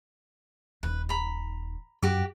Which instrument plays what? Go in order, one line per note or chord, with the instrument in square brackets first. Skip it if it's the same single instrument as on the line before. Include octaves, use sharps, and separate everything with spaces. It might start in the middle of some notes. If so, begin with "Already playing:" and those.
[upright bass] D#1 D#4 [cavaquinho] B4
[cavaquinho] A#5 B5
[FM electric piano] F#2 [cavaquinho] F#4 G4 D6